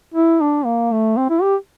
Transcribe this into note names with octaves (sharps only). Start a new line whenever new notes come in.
E4
D4
A#3
A3
C4
E4
G4